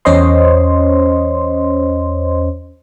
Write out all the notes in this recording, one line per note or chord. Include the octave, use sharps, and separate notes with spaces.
E2 C#4 C5 C#5 D#5 C6